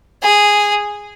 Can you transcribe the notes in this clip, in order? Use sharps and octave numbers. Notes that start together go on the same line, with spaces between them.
G#4